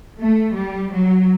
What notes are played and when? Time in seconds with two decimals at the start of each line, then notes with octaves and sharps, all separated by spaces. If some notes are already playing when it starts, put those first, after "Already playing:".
0.19 A3
0.55 G3
0.93 F#3